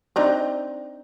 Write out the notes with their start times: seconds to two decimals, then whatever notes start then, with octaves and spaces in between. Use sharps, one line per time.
0.16 C4 D4 D#4